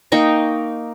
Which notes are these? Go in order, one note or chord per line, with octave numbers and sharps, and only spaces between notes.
A#3 D#4 G5 C#6